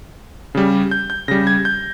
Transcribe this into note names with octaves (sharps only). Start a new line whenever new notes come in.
C#3 G3
G6
G6
C#3 G3 A#6
G#6
G6